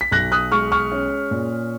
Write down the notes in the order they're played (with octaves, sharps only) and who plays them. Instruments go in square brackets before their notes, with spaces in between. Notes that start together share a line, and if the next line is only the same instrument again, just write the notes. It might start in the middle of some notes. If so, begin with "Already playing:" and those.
[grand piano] B6
B1 F#6 A#6
D#6 F#6
G#3 C#6 F6
C#6 F6
C#4
A#2